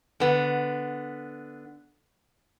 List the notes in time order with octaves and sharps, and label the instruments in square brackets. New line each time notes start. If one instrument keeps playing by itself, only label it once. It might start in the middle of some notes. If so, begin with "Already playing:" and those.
[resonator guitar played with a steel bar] D3 B3